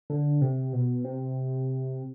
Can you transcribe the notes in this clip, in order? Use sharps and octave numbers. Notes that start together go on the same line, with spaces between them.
D3
C3
B2
C3